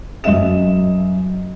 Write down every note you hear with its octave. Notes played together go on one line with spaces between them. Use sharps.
F#2 D#5 E5 E7